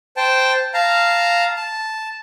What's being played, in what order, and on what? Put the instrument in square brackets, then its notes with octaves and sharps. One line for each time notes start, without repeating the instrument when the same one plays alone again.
[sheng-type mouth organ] C5 G5 A5
F5 A5 A#5
A5